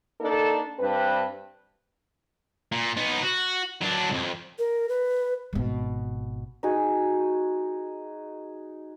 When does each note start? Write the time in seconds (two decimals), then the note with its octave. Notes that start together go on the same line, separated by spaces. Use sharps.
0.21 A#3 D4 D#4 A4
0.80 G2 C4 D4 B4
2.72 A#2
2.97 B3 D#4
3.23 F#4
3.82 F#3 D4
4.10 C2 F2
4.59 A#4
4.89 B4
5.53 G#1 B2
6.63 D#4 F#4 G#4